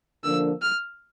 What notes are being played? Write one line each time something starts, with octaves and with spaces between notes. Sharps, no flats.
D3 F3 A#3 D4 E6
F6